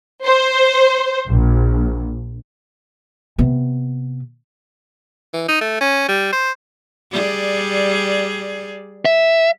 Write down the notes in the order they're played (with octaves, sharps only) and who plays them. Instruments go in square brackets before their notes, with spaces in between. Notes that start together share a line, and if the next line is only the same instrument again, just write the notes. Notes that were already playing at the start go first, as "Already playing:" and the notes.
[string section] C5
A#1
[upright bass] C3 B3
[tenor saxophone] E3
D#4
A3
C#4
G3
C5
[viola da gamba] G3 G#4 D5
[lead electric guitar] E5